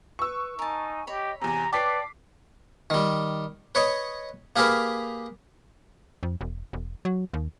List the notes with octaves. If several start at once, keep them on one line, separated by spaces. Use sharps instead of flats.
B4 C#6 E6
D#4 A#4 G#5 A5
G4 C#5 D#5 B5
E2 C3 G#5 A#5
B4 C#5 D5 G5 A5 D6 B6 C7
D#3 G3
B4 C#5 D#5
A#3 G4 G#4 A#4 B4
F2
E1
E1
F#3
D#2